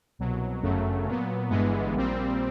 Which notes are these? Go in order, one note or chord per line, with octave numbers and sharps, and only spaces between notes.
C2 B2 F#3
G1 F#2 C#3 F#3 A3
A#2 F#3 B3
G1 G2 E3 G#3 B3
A#1 A#2 G3 C4